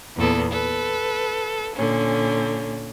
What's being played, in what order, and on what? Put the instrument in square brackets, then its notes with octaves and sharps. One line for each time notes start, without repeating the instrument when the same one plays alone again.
[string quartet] E2 A#2 B3 A4
A4 B4
A#2 D3 C#4